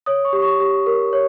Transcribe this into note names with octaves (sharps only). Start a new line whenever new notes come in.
C#5 D#6
C#6
G4
C#6
G4
A#4
C#5